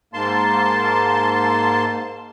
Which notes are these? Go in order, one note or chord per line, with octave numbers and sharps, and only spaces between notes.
G#2 A#3 A5 C6